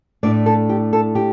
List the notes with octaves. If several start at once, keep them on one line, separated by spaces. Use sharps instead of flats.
A2 A3 D4 D5
A4
G4
A4
G4